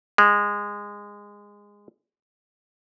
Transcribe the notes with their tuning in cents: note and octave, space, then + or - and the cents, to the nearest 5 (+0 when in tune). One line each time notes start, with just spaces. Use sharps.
G#3 -20